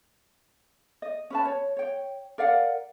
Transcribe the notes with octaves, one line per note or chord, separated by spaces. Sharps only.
D#5
C#4 B4 A5
C#5
C#5 G5
A#4 D5 F5 F#5